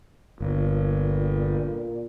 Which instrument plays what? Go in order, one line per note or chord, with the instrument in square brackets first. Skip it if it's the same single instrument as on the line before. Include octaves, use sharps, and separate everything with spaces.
[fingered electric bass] G1 [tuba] A#2